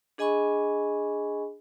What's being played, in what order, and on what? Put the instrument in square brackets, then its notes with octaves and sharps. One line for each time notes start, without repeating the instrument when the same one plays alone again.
[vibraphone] D4 G#4 D#5 G#5 B5 C#6